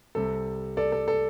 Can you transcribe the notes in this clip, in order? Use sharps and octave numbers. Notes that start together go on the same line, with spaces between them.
C2 C3 G3 A4
A4 D5
A4
A4